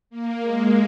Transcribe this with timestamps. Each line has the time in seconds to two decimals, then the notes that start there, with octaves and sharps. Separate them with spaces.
0.10 A#3
0.42 G#3